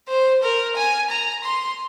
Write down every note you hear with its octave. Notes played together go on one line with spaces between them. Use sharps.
C5
A#4
G#5
A#5
C6